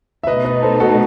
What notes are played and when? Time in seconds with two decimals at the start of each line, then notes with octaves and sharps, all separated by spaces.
0.23 E5
0.27 B2 A3 D#4 B4 D#5
0.45 B4 D#5
0.63 A4 C5
0.80 F#4 A4
0.91 A4